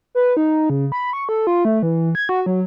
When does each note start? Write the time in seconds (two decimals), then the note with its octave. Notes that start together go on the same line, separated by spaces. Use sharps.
0.15 B4
0.37 D#4
0.70 C#3
0.92 B5
1.13 C#6
1.29 A4
1.47 F4
1.65 A3
1.83 E3
2.15 G#6
2.29 F#4
2.46 F#3